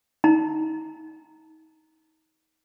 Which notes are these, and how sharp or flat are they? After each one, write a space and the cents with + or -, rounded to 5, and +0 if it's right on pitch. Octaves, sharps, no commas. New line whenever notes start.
D#4 +30 A#5 -15